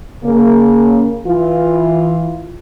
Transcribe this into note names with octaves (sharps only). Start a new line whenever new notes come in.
C#3 A#3
E3 F4